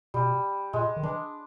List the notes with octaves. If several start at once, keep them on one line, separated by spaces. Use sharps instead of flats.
B2 G3
A#2 G#3
D#3
E3 D4